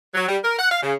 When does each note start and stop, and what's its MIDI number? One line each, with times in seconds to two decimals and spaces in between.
0.14 0.27 54
0.28 0.38 55
0.44 0.55 70
0.59 0.71 78
0.71 0.81 77
0.83 0.94 49